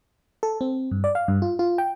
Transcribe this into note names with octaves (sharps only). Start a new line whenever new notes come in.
A4
C4
G2
D5
F5
G2
F4
F4
G5